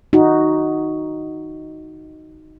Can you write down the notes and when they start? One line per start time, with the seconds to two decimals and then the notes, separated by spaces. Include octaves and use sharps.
0.13 D#4 F#4